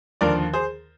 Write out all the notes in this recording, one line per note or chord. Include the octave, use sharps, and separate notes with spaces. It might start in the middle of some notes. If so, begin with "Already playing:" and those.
D#2 D3 F3 A#4 D5
G#4 C5